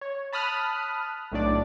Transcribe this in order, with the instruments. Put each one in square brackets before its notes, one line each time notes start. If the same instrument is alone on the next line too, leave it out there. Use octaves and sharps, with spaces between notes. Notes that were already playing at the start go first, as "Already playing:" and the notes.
[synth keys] C#5
A5 B5 D#6 F6 F#6
B1 A2 A3 D4 D5